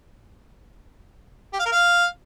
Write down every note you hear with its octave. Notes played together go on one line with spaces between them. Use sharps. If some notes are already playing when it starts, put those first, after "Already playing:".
G4
F5
A#4
F5